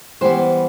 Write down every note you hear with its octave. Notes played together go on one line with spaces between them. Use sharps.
E3 G3 B3 C5